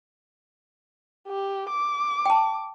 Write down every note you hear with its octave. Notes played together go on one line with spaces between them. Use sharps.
G4
D6
G5 A5